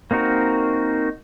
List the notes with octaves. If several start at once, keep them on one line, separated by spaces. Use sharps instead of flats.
A#3 C4 D#4 F#4 A#4